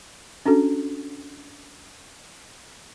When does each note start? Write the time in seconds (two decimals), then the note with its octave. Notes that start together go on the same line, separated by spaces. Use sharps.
0.46 C#4 D4 F#4 A4